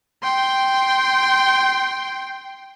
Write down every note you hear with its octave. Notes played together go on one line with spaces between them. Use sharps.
G5 C6